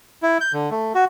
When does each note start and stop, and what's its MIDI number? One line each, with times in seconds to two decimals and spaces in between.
0.23 0.38 64
0.41 0.52 91
0.53 0.70 50
0.71 0.93 57
0.95 1.05 66